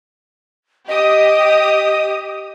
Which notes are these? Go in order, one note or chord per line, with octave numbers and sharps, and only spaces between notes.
G4 D#5 D#6